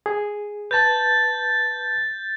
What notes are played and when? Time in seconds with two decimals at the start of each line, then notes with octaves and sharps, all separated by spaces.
0.06 G#4
0.71 B4 A5 G6 A6